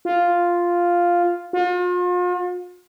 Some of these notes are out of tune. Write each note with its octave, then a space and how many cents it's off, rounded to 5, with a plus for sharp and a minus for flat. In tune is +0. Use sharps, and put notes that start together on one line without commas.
F4 +0
F4 +40